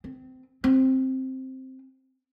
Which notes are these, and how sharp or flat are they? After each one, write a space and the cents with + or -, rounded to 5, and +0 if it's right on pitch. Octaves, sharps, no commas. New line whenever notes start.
C4 -25
C4 +5